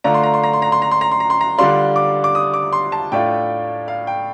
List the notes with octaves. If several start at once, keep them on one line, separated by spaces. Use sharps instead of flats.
D3 A3 D4 F4 A#5
C6
A#5
C6
A#5
C6
A#5
C6
A#5
C6
A#5
C6
A#5
C6
A#5
D3 G3 D4 F4 C6
D6
D6
D#6
D6
C6
A5
A2 A3 D4 F4 G5
F5
G5